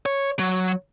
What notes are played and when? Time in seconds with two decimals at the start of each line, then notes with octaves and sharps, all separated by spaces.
0.06 C#5
0.39 F#3